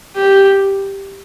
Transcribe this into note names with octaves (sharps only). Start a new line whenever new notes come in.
G4